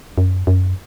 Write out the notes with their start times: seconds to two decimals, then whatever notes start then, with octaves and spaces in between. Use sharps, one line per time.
0.18 F#2
0.47 F#2